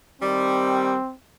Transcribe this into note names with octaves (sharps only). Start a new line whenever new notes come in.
D#3 G3 C4